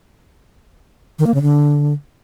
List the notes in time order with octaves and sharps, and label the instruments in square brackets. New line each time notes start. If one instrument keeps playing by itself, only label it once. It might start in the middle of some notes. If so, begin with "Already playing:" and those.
[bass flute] D#3
A#3
C#3
D3